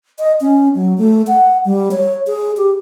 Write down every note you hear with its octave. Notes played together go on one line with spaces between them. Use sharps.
D#5
C#4
F#3
A3
F#5
G3
C#5
G#4
G4